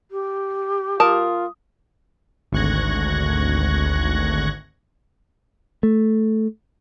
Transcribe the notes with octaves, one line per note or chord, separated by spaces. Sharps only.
G4
F4 A#4 A5 D#6
G#1 D2 C#6 F#6 G#6 A#6
A3